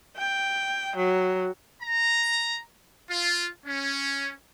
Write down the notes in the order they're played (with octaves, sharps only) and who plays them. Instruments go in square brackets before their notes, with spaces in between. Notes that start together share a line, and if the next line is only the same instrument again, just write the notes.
[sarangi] G5
F#3
[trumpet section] A#5
F4
C#4